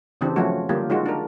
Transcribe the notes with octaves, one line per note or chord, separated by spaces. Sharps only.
C#3 E3 C4 D4 G4
F3 F#3 A3 C#4 F#4
D3 G3 A#3 F4 G4
G#3 D#4 F4 F#4
D4 A#4